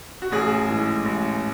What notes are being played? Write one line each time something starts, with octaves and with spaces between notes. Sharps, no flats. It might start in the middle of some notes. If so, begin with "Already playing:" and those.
F#4
A1 G#4
G#2 E3
A1